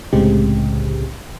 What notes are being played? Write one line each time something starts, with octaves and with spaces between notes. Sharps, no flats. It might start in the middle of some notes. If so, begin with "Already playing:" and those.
C2 A2 C#3 G#3 C4 G4